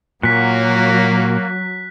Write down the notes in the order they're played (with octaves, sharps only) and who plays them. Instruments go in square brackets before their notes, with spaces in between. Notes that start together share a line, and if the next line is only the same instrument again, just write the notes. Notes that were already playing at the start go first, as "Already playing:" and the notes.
[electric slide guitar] A#2 [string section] F#3 [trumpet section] A#3 F#4 [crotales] F#6 B6